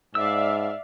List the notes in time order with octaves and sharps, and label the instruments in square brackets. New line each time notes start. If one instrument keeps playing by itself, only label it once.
[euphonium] G#2 [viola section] D5 E5 F5 [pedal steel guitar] E6